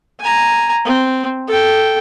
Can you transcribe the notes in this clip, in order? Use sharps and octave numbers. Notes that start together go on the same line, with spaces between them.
G#5 A#5
C4
A4 G5